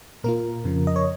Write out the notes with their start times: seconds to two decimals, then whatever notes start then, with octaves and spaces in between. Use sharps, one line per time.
0.24 A#2 A#3 F4 A#4
0.64 F2 C#3 F3
0.87 D#5
0.96 C#5